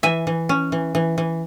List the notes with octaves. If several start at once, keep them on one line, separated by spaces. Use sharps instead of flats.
E3 E5 G#5
E3
C#4
E3
E3
E3